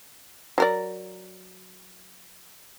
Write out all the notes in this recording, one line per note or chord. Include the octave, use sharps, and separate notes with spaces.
F#3 A#4 D5